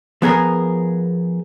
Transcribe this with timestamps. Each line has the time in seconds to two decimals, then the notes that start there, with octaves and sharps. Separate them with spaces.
0.22 F3 B3 G#4 A#4